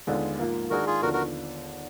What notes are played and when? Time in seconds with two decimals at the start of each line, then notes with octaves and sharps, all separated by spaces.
0.07 D#2 D3 G#3 B3 F4
0.39 G#2 F3 A#3 F4
0.70 D#3 G#3 D4 F#4 G#4 A#4
0.87 F4 G#4
1.02 D#2 D3 F3 B3 D4 F#4 A#4
1.13 F#4 A#4